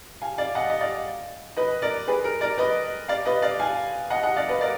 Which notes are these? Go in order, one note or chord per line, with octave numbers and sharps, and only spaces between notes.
F5 G#5
D5 F5
D#5 F#5
D#5
D5 F5
B4 D#5
A#4 D5
G#4 B4
A#4
A#4 D5
B4 D#5
D5 F5
B4 D#5
D5 F5
F5 G#5
D#5 F#5
D#5 F#5
D5 F5
B4 D#5
A#4 D5